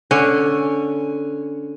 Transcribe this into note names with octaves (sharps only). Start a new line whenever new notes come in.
D3 C#4